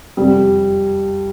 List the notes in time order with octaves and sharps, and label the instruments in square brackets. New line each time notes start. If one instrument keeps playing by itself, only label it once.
[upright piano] F2 C3 G3